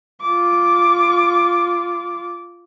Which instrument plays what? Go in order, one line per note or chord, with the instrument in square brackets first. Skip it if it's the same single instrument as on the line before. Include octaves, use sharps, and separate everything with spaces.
[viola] F4 D6